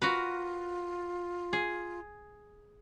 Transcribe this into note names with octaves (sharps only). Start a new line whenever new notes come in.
F4 F#4 A#4 B4
G#4